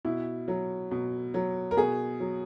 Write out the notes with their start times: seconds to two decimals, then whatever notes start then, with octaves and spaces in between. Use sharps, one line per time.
0.05 B2 E4
0.48 F#3
0.91 B2
1.34 F#3
1.71 A#4
1.77 B2 G#4
2.20 F#3